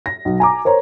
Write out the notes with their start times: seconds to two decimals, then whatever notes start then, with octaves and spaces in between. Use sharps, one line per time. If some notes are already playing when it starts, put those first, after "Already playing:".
0.06 A#6
0.25 B1
0.40 G#5 A#5 D6
0.65 A#4 C5 C#5 A#5